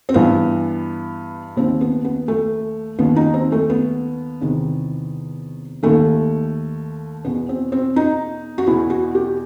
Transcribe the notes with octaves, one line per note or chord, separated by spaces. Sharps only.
C4
G2 E3 B3
D#2 D#3 C4
B3
B3
A3
D#2 D#3 B3
D#4
C4
A3
B3
E2 C3 D#3
D#2 D#3 A3
E2 B2 B3
C4
C4
D#4
F#4
E2 B2 E4
F#4
G4